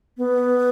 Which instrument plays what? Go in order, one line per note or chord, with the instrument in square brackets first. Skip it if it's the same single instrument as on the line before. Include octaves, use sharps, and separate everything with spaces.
[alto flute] B3